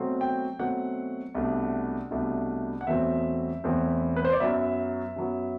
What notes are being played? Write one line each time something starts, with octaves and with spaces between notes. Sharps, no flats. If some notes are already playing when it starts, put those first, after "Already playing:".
Already playing: B2 F#3 A3 C4
G5
B2 F#3 A3 C4 F#5
C2 B2 A3 D4
C2 B2 A3 D4
F#5
E2 B2 F#3 A3 C4 E5
E2 B2 F#3 A3 C4
B4
C5
D5
F#2 F#3 B3 E5
F#2 F#3 B3